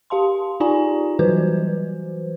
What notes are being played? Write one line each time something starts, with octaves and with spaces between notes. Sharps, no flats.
G4 F5 A5 C6
D#4 F4 G4 D5 G#5 A#5
E3 F#3 G3 F#4 B4 C5